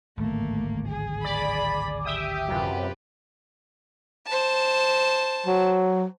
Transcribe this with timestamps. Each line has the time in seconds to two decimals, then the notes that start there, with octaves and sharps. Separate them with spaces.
0.17 D1 G#1 A3 A#3
0.88 G#4
1.24 D5 B5
2.05 G4 E5 G5 D#6
2.48 F#2 C3 F4 B4
4.27 C5 A5
5.46 F#3